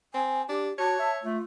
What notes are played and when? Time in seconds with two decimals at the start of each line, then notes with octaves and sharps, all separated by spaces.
0.14 C4 G#5
0.49 D4 G4
0.78 F#4 C#5 A5
0.99 E5
1.23 A3 F4